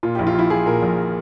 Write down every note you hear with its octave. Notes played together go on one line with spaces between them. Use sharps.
A#2 F4
G4
A#1 E4
F4
F3 E4
F3 G#4
A#2 A#4
A#1